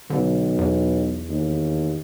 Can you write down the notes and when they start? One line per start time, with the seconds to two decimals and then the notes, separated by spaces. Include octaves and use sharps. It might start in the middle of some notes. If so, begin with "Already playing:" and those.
0.10 B1 D3
0.58 E2
1.29 D#2